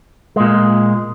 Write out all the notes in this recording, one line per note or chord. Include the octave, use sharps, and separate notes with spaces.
A#2 G#3